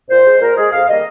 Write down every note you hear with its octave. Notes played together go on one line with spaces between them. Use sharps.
A#2 C5
G#3
A#2 A#4
G#3 G#4
F2 F5
D#3 G3 A#3 D#5